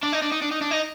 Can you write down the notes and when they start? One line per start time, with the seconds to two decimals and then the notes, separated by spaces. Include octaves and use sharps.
0.03 D4
0.13 D#4
0.22 D4
0.32 D#4
0.42 D4
0.51 D#4
0.62 D4
0.71 D#4